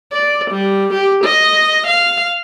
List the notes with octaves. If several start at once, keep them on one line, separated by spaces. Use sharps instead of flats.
D5
G3
G4
D#5
F5